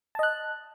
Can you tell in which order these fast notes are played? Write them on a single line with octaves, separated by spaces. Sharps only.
A5 D#5 F#6